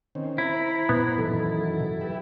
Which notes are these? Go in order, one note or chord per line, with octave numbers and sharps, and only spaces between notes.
D#3 C4 C#4
E4 C5 A#5 B5
A#2 B3
F#2 D#3 E3 F#3 A4
G4 B4 E5